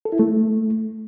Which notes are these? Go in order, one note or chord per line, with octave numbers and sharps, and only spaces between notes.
A4
E4
A3